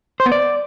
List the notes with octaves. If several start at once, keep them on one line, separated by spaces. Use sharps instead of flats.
C5
B3
D5